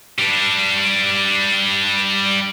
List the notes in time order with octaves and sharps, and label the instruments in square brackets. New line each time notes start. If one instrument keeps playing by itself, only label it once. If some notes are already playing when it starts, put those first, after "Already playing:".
[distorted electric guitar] G3 D4